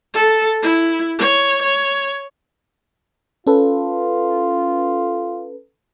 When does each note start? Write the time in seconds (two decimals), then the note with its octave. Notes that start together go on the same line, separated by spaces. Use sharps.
0.14 A4
0.62 E4
1.19 C#5
1.62 C#5
3.47 C#4 F4 A4 B4